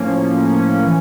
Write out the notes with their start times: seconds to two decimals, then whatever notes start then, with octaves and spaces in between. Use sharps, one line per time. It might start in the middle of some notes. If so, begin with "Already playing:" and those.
Already playing: A2 F3 A#3 C#4
0.23 F3
0.54 C#4
0.84 E3